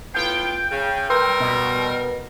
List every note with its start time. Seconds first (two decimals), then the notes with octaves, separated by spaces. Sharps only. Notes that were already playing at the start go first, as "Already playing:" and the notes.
0.14 A2 B3 F4 G5
0.71 C#3
1.10 G3 A#4 B4 C6 E6
1.40 B2